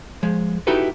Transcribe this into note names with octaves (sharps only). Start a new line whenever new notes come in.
F3 G#3
D#4 E4 F#4 G4 A4 B4